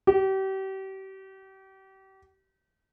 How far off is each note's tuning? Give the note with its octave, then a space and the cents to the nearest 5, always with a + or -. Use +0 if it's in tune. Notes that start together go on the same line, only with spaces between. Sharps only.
G4 -35